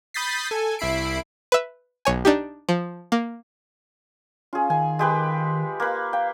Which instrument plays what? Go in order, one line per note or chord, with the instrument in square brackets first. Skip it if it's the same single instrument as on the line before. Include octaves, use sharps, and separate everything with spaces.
[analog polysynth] B5 D#6 G6 A6 B6 C7
A4 G#5
C2 E4 B5 C7 D7
[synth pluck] B4 E5
B1 C#5 G#5
D4 D#4 G4
F3
A#3
[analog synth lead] C#4 [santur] F4 G#4
[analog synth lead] D#3 [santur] G#5
[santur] G#3 G4 B4
A#3 B4
[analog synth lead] F5 [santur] G5